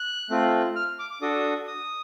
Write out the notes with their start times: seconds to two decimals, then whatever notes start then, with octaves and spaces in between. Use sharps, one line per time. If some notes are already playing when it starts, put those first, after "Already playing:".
Already playing: F#6
0.30 A3 C4 F4
0.76 F6
0.99 D6
1.10 D6
1.21 D4 F#4 A4 D#6
1.67 D#6